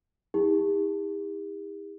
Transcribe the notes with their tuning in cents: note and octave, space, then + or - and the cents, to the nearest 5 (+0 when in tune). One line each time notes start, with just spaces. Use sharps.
E4 -45 G4 +45